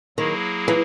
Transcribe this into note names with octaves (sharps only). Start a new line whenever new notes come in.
D#3 F#3 A#3 E4 G#4
E3